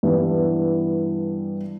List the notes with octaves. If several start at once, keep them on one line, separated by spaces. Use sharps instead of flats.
G2 E3 G3 B3 E4